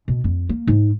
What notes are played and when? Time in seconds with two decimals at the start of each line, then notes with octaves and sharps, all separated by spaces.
0.08 B2
0.24 F2
0.49 A#3
0.67 G#2